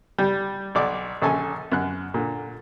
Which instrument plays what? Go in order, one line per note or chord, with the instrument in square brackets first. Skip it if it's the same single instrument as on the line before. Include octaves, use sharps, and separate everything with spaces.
[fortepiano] G3
B1 D5 D6
A#1 C#4 A4 G#5 A5
F#2 F#6
A#2 D3